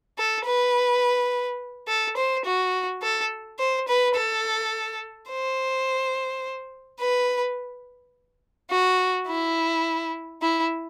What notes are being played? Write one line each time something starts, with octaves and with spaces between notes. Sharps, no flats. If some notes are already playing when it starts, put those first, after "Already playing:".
A4
B4
A4
C5
F#4
A4
C5
B4
A4
C5
B4
F#4
E4
E4